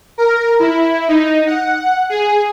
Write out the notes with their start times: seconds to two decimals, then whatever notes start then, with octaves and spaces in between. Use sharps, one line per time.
0.18 A#4
0.59 E4
1.08 D#4
1.46 F#5
2.09 G#4